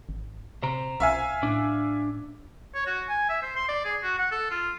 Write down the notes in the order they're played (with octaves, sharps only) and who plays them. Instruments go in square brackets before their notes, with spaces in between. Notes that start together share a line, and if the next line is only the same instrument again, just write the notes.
[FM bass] G#1
[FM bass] C3 [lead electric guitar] C5 A#5
[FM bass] B1 [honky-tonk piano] E5 F5 G#5
[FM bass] A2 [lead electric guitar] D4 D5
[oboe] C#5
F#4
G#5
E5
C5
C6
D5
G#4
F#4
F#5
A4
F4